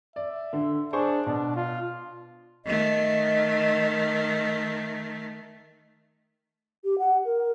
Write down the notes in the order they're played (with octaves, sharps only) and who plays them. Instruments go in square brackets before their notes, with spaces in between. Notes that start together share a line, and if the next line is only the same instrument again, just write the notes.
[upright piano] D5 [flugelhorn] E5
[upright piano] D3
[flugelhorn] D4 [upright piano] G#4 C5 C#6
[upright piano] B2 [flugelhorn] D4
[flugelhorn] F4
[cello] D#3 A3 [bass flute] D#5
[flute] G4
F#5
A#4